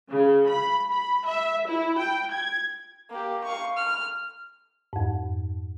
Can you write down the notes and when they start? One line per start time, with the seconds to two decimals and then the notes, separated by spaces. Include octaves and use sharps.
0.10 C#3
0.48 B5
0.91 B5
1.26 E5
1.69 E4
1.98 G5
2.31 G#6
3.10 A#3 G4
3.43 F5 C#6
3.77 F6
4.93 F2 G#2